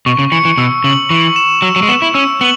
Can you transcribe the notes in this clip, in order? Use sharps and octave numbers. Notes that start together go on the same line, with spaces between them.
B2 C#6
C#3
E3 C#7
E3
B2 E6
C#3 F#7
E3 C#6
E7
F#3 E6
F#3
G#3
B3 E7
E4
C#4 E6
B3 F#7